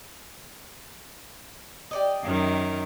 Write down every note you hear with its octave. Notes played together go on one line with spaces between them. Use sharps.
G4 D5 D#5
F#2 D#3